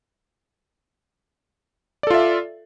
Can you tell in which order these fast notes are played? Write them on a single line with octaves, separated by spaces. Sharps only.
D5 A4 F4 E5